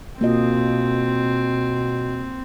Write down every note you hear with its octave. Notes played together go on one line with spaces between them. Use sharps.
B2 A#3 C4 F4 D#5